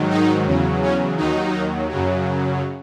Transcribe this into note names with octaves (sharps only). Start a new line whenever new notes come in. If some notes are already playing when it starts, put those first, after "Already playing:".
Already playing: G#2 D#3 F#3
D#4
E2 C#3 F#3
C#4
D#2 D#3 F#3 D#4
F#2 C#3 F#3